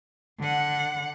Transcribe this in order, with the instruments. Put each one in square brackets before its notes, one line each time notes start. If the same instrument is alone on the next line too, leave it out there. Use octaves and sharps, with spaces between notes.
[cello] D3 F#5